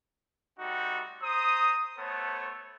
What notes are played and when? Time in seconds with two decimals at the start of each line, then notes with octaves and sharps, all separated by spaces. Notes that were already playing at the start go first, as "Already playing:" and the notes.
0.59 G3 A3 C4 D#4 F#4
1.23 C5 A#5 D#6
1.98 A3 B3 A4 C5 C#5